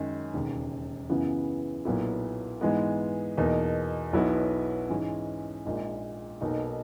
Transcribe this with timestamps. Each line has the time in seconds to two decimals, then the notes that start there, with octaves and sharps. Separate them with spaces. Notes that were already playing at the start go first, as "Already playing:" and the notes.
Already playing: F#2 D#3 G#3
0.34 E1 D#2 C#3
1.10 F#2 C#3 E3 B3 E4
1.85 B1 A#2 F#3 B3 E4
2.61 G#2 E3 G#3 B3
3.37 E2 B2 A#3 D#4
4.13 B1 B2 F#3 B3 E4
4.89 G#2 E3 G#3 C#4
5.65 A#1 A#2 G#3 D#4
6.41 B1 B2 A#3 D#4